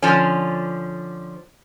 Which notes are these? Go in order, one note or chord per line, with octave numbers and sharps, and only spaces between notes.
D3 F3 C#4